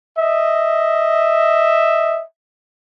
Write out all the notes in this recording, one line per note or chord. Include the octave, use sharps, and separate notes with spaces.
D#5 E5